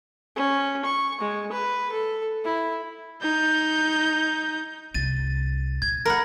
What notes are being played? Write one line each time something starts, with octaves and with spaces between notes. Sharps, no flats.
C#4
C#6
G#3
B4
A4
E4
D#4 G6
C2 D4 A6 D#7
A#2 G#6
A#4 F#5 B5 A#6